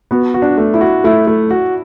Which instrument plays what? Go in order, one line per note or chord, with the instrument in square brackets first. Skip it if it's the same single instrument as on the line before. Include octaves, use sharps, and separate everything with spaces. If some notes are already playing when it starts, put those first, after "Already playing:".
[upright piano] B3 [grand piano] F#4
[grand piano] F#4
[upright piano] D4
[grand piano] A3
[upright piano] E4
[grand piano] F#4
[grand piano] A3 [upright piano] E4
[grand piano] A3
F#4